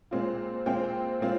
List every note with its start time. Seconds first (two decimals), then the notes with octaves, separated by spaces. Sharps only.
0.11 A#2 G#3 C4 F4
0.66 A#2 G#3 C4 F4 G5
1.20 A#2 G#3 C4 F4